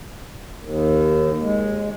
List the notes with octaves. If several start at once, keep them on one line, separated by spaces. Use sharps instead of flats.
D#2
G#3